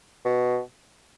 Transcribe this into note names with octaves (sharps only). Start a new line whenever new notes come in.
B2